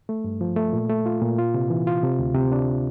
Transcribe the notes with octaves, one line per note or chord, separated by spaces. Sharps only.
A3
G2
F3
A3
A#2
A3
F4
A#2
F4
C3
E3
F4
C3
D2
C3
D4